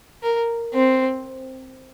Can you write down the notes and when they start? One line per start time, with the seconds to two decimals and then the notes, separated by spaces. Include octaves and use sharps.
0.23 A#4
0.74 C4